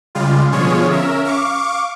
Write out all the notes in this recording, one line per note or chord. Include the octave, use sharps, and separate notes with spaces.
C#3 G3 G#3 F4
B2 D3 F3 F4 G#4 C#5
C#4 A#4 E5
F5 C#6 D6